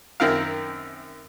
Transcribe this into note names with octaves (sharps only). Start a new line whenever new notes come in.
F#2 D#3 C4 E4 A#4 F5